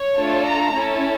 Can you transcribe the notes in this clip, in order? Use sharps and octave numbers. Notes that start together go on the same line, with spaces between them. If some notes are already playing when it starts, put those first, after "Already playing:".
Already playing: C#5
A3 D4 F4 A4
A#5
C#4 E4 A4